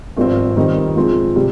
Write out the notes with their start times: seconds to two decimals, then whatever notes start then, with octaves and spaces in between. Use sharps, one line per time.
0.17 G#1 G2 F3 C4
0.56 F2 D#3 G3 C4 D#4
0.96 G#2 F3 C4 F4 G#4
1.36 C3 G3